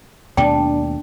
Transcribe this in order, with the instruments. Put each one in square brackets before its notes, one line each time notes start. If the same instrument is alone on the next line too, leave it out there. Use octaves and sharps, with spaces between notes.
[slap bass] D#2 B2 A3 [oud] D4 [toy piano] G5